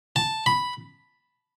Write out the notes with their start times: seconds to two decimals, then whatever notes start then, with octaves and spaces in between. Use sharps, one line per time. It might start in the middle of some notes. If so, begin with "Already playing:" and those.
0.16 A5
0.46 B5